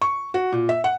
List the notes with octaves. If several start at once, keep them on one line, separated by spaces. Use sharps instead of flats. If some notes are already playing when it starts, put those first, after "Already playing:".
C#6
F#4
A#2
E5
F#5